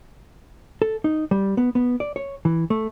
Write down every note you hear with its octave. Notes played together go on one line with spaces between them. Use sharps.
A4
D#4
G3
B3
B3
D5
C#5
E3
A3